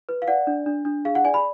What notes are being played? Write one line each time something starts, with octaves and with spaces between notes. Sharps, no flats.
B4
F5
D5 F#5
D4
D4
D4
G#4 F5
F#5
D5 G#5
B5